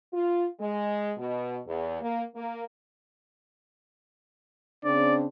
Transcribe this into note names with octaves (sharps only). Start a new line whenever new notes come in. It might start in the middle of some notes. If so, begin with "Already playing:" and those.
F4
G#3
B2
E2
A#3
A#3
C#3 C4 D4 D5